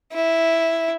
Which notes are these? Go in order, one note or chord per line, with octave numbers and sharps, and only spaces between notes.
E4